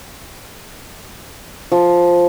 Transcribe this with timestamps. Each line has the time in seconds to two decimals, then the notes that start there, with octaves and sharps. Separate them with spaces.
1.72 F3